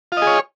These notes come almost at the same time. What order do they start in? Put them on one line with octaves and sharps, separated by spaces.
F4 D#5 G#4 C#5